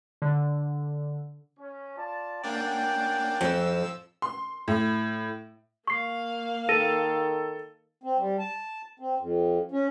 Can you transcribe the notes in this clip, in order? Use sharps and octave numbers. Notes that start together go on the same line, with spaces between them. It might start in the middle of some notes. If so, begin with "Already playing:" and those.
D3
C#4
F4 D5 A5
A#3 C#4 D4 D5 F#5 G5
F2 F3 E6
C6
A2
A#3 F5 C#6 C7
D#3 A4 A#6 D#7
C4
G3
A5
C4
F2
C#4